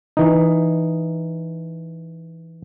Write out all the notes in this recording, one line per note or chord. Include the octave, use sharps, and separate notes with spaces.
E3 D#4